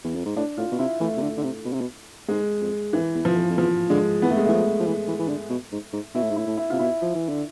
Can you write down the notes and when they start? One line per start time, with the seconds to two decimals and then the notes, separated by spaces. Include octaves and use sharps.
0.04 E2
0.15 F2
0.26 G#2
0.36 A2 D4
0.57 A2 F4
0.72 B2
0.79 C3 E4
1.00 E3 A3
1.17 C3
1.21 D3
1.37 D3
1.43 C3
1.65 B2
1.73 C3
1.81 B2
2.28 G#2 G#3
2.61 F2
2.93 F2 E3
3.15 E2
3.25 F3
3.36 F2
3.50 F2
3.57 E2 F3
3.90 D3 G#3
4.22 E3 B3
4.30 A3
4.37 G#3
4.46 E3 A3
4.53 F3
4.80 F3
4.86 E3
5.08 E3
5.19 E3
5.28 D3
5.50 B2
5.72 G#2
5.93 G#2
6.15 B2 E4
6.22 A2
6.30 G#2
6.36 A2 E4
6.47 A2
6.57 E4
6.70 C3 F4
6.79 B2 E4
7.02 F3
7.15 E3
7.29 D3